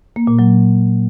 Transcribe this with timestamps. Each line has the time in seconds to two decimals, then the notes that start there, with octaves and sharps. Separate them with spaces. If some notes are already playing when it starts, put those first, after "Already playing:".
0.16 A#3
0.27 A#2
0.39 F#3